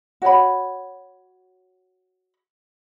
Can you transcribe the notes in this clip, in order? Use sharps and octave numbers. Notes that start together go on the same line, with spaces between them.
F#4 C#5 G5 B5